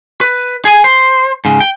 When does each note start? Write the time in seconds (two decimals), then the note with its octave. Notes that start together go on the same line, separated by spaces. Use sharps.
0.21 B4
0.65 G#4 G#5
0.84 C5
1.45 G#2 C#3
1.60 G5